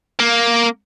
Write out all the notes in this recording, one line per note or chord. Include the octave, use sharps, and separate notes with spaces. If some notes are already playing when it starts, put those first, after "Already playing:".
A#3